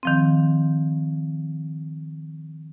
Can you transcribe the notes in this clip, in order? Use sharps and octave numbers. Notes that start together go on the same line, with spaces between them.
D#3 F3 C4